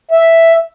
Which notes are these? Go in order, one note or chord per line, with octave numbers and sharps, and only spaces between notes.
E5